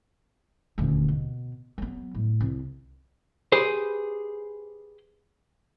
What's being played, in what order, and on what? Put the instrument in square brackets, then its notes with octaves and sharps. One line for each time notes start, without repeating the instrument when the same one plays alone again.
[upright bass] D#1 D2
B2
F#3 B3
A2
C2
[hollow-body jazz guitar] G4 G#4 B4 C5